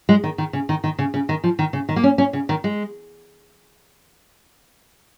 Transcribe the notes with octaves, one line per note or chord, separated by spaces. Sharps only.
G#3
D#3
D#3
C#3
D#3
D#3
C#3
C#3
D#3
F3
D#3
C#3
D#3
A#3
C#4
C#4
C#3
D#3
G#3